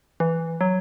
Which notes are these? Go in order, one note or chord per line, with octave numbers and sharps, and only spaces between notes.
E3
F#3